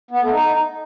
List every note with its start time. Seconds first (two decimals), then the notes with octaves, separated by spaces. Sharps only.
0.11 B3
0.21 A3
0.31 D#4